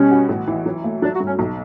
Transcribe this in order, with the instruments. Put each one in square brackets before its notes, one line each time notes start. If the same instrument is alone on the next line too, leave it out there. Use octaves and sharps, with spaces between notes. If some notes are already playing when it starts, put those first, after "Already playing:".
Already playing: [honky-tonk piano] B2 G3 [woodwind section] C#4
[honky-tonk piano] F#4
A1
E3
F#3
A3
[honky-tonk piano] F#3 [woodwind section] D4
[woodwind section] F#4
[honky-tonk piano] G2
[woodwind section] C#4
[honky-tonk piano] B1